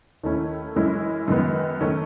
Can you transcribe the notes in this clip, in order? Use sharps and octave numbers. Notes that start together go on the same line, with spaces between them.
D#2 D#3 A3 C#4 E4
F#2 E3 G#3 C#4 E4
F#2 D#3 G#3 B3
D#3 A3 C#4